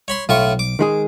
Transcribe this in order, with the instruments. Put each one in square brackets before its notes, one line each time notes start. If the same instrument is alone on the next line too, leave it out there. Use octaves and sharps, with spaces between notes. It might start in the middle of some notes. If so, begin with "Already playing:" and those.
[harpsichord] C#5 B5 C6
[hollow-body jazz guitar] B1 [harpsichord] A2 F4 C#6
[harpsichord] D6
[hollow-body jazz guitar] D#3 G#3 G#4